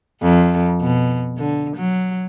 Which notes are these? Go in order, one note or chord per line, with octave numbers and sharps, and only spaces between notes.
F2
B2
D3
F#3